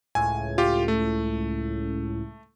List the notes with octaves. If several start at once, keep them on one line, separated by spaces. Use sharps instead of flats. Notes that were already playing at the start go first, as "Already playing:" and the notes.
C#2 A2 G#5
F4 G4
A3